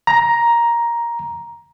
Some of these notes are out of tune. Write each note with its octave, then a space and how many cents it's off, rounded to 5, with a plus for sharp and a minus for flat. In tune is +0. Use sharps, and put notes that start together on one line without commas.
A#5 +10